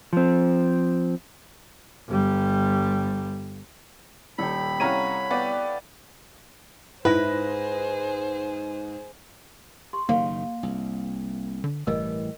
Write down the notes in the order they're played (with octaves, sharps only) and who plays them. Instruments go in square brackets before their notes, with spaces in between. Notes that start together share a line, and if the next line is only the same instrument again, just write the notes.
[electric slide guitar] F3 C4
[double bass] G1 G3
[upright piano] D#1 [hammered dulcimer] A4 G5 [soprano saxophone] B5
[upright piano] C2 [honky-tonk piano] C#4 A#5 D#7 [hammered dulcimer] C#5 F5 F#5
[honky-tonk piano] B3 [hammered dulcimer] D5 F5 G5
[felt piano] G#2 A#6 [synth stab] E4 [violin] G#4 C5 [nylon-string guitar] B4
[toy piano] G4 C6
[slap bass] F#1 D#3 [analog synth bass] A#3 [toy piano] F5
[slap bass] C2
[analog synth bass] D3
[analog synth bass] G1 [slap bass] A2 E3 G3 [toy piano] A#4 D#5